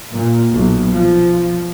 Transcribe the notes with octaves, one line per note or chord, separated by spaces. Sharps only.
A#2
B1
F3